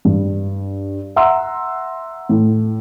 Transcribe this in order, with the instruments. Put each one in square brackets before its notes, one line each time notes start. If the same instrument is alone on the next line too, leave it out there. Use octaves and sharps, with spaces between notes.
[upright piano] G2
E5 F#5 A#5 C6 E6
A2